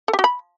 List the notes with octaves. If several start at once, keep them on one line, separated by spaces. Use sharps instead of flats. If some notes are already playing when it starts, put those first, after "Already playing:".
A4
G4
F#4
B5